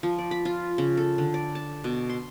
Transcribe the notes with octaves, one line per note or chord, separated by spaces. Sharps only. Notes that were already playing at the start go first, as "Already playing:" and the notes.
F3
D5
B5
F4
C#3
A4
D3
D5
A5
B2
C6